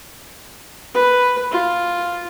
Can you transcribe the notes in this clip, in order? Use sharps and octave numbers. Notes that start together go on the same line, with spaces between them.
B4
F4